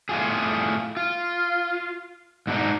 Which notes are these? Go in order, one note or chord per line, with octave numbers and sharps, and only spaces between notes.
A2 F4 G4 G#4
F4
G#2 B2 D4 D#4